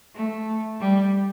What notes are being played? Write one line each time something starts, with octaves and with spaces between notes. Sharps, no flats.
A3
G3